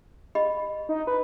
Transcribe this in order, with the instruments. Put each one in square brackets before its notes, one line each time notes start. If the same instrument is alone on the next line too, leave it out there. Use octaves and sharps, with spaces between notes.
[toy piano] G4 D#5 B5
[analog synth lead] D#4
B4